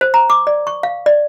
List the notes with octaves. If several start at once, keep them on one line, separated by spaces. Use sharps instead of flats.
C5
A#5
D6
D5
C#6
F5
D5